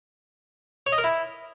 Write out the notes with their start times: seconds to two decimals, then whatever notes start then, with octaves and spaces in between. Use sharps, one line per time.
0.87 C#5
0.92 D#5
0.98 A#4
1.04 E4